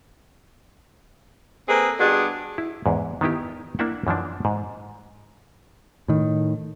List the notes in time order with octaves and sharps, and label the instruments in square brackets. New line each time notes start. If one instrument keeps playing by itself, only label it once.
[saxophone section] A#3 C4 G#4 A4 B4
G2 B2 D4 G#4 F#5
[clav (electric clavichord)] E4
E2 G#2
D#3 B3 D#4 E4 G4
A#3 D4 E4 E5 F#5
F#2 E3 F3 D4
G#2
[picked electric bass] A2 D#3